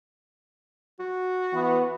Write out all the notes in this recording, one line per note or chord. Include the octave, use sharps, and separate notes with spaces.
F#4
E3 B3